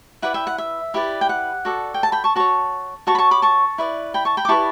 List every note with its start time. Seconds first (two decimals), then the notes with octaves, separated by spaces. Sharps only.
0.22 E4 B4 D5 F#5
0.34 E5 G5
0.47 F#5
0.58 E5
0.94 E4 G4 B4 D5
1.21 G5
1.29 F#5
1.65 F#4 A4 D5
1.94 G5
2.03 A5
2.12 G5 B5
2.24 A5 C#6
2.36 F#4 C#5 A5 C#6
3.07 F#4 C#5 A5 C#6
3.15 B5
3.19 A5 C#6
3.31 B5 D6
3.42 A5 C#6
3.78 E4 B4 D5
4.14 G5 B5
4.25 A5 C#6
4.37 G5 B5
4.45 D6
4.49 E4 G4 B4 D5 A5 C#6